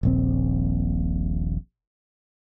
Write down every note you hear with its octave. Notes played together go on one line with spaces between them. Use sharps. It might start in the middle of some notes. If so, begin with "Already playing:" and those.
D#1 A#1 C4